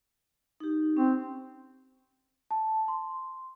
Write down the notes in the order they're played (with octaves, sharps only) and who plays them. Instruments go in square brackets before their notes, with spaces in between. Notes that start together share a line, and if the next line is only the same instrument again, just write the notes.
[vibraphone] D#4 G4
[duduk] C4 [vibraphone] C#4
[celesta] A5
C6